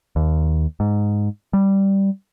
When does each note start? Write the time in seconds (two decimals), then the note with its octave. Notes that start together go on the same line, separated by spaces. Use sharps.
0.16 D#2
0.80 G#2
1.53 G3